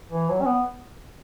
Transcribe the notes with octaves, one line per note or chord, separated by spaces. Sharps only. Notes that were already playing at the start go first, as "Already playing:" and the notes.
E3
F#3
C#4
B3